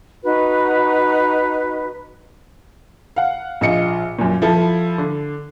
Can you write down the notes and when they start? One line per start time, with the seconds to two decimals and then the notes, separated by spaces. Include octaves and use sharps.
0.23 D#4 F#4 B4
3.16 F5 F#5
3.61 A#1 F4 D#5 C#7
4.19 F#2 A#2
4.42 F3 E4 A4
4.98 D3